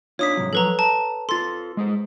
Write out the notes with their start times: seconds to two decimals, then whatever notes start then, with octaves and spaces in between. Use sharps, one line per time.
0.19 D4 D#4 F4 C#5 D#6 B6
0.37 G#2 C3 F#3
0.53 F3 F#3 A4 B4 A#5
0.79 A5 A#5
1.29 F4 A4 C6 A6
1.77 G#3 G#4 C5